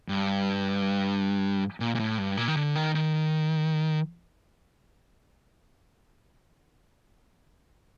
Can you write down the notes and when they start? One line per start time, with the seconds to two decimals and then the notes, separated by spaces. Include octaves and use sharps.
0.09 G2
1.80 A#2
1.95 A#2
1.99 A2
2.18 G2
2.37 A#2
2.48 D#3
2.56 D3
2.76 D#3
2.95 D#3